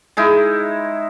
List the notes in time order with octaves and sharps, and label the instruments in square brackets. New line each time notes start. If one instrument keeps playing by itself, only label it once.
[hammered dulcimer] G#3 D#4 E4